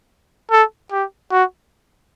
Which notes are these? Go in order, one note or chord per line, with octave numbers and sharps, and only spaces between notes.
A4
G4
F#4